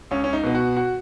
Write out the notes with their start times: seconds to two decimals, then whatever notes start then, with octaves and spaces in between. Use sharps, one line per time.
0.11 C#2 C#4
0.24 C#4
0.33 D#4
0.44 B2 B3
0.55 F#4
0.77 F#4